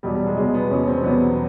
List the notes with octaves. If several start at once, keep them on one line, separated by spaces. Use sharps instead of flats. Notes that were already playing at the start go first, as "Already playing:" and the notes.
E2 B2 F#3 G3
G3
G#3
E2 B2 F#3 G#3
B3
E2 B2 F#3 C#4
C4
E2 B2 F#3 B3